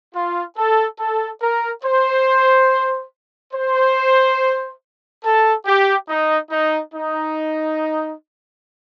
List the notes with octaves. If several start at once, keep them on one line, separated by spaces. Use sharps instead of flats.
F4
A4
A4
A#4
C5
C5
A4
G4
D#4
D#4
D#4